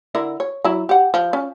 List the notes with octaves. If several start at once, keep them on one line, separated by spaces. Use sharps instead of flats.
D3 E4 A#4
C#5
F#3 E4
G4 F#5
F3
C#4